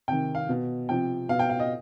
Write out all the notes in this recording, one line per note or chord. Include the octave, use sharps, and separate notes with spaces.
C3 D#3 G5
F5
B2
C3 F3 G5
B2 F5
G5
F5
D#5